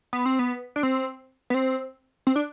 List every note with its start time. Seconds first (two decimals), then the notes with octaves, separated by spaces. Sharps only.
0.13 B3
0.26 C4
0.39 B3
0.76 D4
0.83 C4
1.50 B3
1.54 C4
2.27 C4
2.36 D4